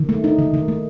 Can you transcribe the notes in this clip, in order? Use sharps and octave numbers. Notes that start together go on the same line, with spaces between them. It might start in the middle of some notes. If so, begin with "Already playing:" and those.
Already playing: D#3
A3
D#4
D#3
D#3
A3